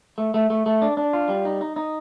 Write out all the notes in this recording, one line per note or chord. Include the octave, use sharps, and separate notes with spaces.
A3
A3
A3
A3
D4
D4
F4
G3
D#4
D#4
D#4